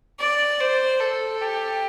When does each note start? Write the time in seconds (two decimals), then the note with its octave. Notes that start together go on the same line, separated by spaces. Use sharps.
0.20 D5
0.61 C5
1.00 A4
1.42 G4